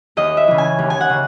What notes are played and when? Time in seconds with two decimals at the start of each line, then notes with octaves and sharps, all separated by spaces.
0.17 D#2 D#5
0.37 E5
0.48 C#3 E3
0.58 G#5
0.78 D#2
0.90 G#5
1.01 F#5
1.10 C#3